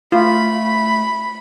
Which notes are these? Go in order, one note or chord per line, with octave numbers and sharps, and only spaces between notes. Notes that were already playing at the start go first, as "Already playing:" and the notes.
A3 F4 B5